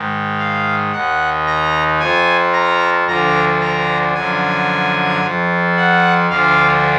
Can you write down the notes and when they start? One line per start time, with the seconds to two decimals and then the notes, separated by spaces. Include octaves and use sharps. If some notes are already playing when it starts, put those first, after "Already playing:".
Already playing: G#2 D#3
0.38 F5
0.92 D#2 D#3 F#5
1.47 A#5
1.99 F2 F3 G#5
2.53 A#5
3.07 D2 D3 F3 A#5
3.61 A#5
4.14 F#2 D3 F3 G#5
5.22 F2 F3
5.76 F#5
6.29 D2 D3 F3 F5